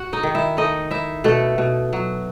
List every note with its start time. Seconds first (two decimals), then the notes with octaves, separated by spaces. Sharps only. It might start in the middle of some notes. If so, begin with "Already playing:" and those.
Already playing: F#4 F#5
0.13 D#4 D#5
0.23 D#3
0.35 E4 E5
0.57 A3 D#4 D#5
0.91 D#4 E4 E5
1.24 B2 A3 A4
1.58 B2
1.93 F#3